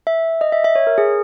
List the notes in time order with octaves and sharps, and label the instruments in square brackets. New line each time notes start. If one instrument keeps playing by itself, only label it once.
[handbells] E5
D#5
E5
E5
C#5
A#4
G#4